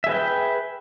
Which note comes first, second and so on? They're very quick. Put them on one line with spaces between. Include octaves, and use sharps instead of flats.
E5 G#4 B4 G5